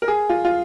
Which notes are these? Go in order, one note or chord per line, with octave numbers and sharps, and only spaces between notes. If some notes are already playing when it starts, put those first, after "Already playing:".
A#4
G#4
F4
F4